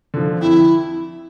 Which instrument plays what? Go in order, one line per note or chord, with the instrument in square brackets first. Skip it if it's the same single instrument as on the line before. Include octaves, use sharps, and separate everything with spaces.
[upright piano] D3 F3
[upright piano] F2 [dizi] E4